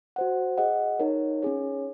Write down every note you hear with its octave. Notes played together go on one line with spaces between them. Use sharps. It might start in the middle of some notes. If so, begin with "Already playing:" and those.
F#4 C5 F#5
G#4 D#5 F#5
D#4 A#4 C#5
C#4 G#4 C#5